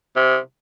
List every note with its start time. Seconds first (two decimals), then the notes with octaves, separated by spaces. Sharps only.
0.16 C3